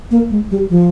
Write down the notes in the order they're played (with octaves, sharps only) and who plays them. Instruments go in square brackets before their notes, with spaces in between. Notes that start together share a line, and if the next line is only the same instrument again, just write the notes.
[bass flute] A#3
G#3
G3
F3